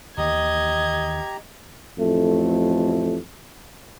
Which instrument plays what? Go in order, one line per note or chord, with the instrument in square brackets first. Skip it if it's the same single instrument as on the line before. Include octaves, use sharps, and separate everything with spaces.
[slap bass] D#2 D#3 E3 [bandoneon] G4 A#5 [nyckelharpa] D#5 [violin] G#6
[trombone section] A1 F2 A3